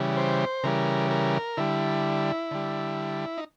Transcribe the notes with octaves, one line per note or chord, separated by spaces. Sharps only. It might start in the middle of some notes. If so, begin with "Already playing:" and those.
Already playing: C#3 E3 G3
C5
C#3 E3 G3 A#4
A#4
D3 G3 E4
D3 G3
D#4